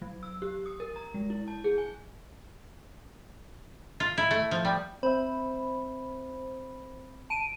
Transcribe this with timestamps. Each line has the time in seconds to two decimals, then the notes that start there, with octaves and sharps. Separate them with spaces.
0.02 F#3
0.23 E6
0.42 G4
0.66 D#6
0.80 A#4
0.96 A#5
1.14 G#3
1.30 E4
1.48 A5
1.64 G#4
1.78 G#5
4.00 F4
4.18 E4
4.31 A3
4.51 F3
4.65 G3
5.03 C4 C5 E5 B5
7.30 A5 D7 D#7